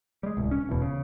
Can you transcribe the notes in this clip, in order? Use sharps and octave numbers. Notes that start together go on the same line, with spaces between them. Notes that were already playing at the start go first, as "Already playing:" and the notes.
G3 G#3
D1 C2
C#4
D1 E2 B2
C#3